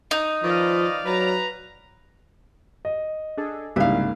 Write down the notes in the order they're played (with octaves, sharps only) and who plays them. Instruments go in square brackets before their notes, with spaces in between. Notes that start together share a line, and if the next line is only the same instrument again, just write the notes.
[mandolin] D#4
[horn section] D#3 B4 D#5 [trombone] F3 [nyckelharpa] D5 F5
[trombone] F#3 [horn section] B4 A#5
[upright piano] D#5
[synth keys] D4 G#4 A4
[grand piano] C2 [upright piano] G#2 [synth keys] C#3 A#3 [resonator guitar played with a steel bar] E4 F5